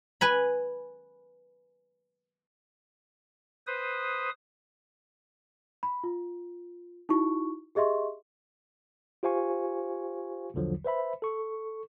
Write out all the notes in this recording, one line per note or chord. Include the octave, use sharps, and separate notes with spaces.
B4 G#5 B5
B4 C5 D#6
B5
F4
D#4 E4 F#4 C#6
G4 G#4 D#5 E5 C6 C#6
F4 G4 C5 F5 G#5 C#6
B1 E2 D3 F3 F#3
B4 C5 E5 B5
A4 C#6